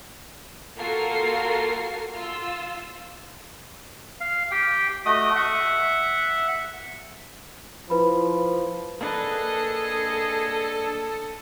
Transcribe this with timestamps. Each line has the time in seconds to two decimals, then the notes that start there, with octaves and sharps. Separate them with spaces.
0.76 A#3 F4 F#4 A4 A#4 C7
2.16 F4 E6
4.20 F5
4.51 G4 G5
5.06 A3 F#4 D#5 D#6
5.35 E5 F#5
7.90 F3 E4 B4 B5
9.01 A#3 D4 G#4 A4 B4 D#5